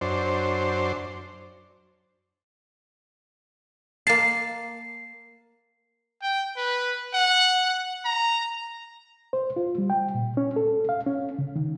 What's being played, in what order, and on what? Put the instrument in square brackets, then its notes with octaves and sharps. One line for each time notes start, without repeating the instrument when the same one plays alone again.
[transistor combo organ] F#2 D4 C5
[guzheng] A#3 A5 [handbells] C7
[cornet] G5
B4
F#5
A#5
[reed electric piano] C5
F4
G3
G5
A#2
C#4
A4
F5
C#4
C#3
D#3